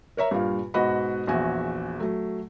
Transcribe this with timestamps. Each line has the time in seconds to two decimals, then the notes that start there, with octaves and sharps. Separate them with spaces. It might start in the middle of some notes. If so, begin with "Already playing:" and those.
0.17 A#4 C#5 E5 A#5
0.31 G2 A#2 F5
0.74 G#2 B2 F#4 D#5 F#5 B5
1.27 A#1 E2 F#4 E5 G#5
2.00 F#3 A3